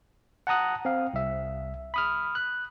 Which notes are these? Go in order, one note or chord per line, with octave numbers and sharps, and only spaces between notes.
F#5 A5 A#5 D#6 F#6
C4 F5
C2 E5
B5 D#6 F6
F#6